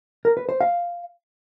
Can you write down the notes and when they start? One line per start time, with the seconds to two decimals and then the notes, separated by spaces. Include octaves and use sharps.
0.25 A#4
0.37 B4
0.49 C5
0.61 F5